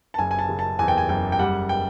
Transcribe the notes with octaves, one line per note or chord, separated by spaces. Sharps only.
A5
F#1 G#5
G#5
A5
C#3
A5
E2 G#5
G5
G#5
F#1 G5
G5
G3 F#5
G5